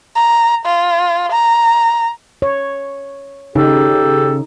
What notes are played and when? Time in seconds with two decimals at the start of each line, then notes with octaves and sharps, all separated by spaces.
0.16 A#5
0.65 F4
1.32 A#5
2.42 C#5
3.55 C#3 D#4 G4 A4